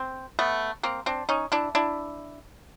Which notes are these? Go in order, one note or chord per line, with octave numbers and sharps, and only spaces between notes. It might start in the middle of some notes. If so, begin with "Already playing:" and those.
Already playing: C4
A3 B3
A#3 C4
C4 D4
C#4 D#4
D4 E4
D4 E4